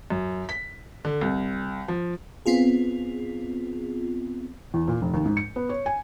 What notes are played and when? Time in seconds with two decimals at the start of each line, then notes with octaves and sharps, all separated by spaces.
0.10 F#2
0.49 B6
1.05 D3
1.21 C2
1.88 F3
2.46 B3 C4 F4 G#4
4.74 E2
4.88 A#2
5.02 F1
5.14 D#2
5.25 G#2
5.37 C#7
5.56 B3
5.69 C#5
5.86 G#5